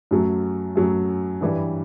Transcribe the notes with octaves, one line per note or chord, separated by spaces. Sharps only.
F#2 F#3 A3
F#2 F#3 A3
G2 E3 G3